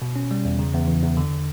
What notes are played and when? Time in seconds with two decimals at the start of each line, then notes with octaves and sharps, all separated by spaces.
0.02 B2
0.16 C#4
0.31 G3
0.45 E2
0.59 C#3
0.74 E2
0.88 E3
1.03 E2
1.17 D3